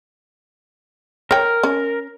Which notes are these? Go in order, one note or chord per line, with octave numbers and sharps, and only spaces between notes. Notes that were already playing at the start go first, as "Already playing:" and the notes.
A#4 C#5 G5
C#4